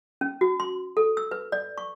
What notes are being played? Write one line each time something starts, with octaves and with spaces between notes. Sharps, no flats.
C#4
F#4
C6
A4
E6
B4
D5
C#6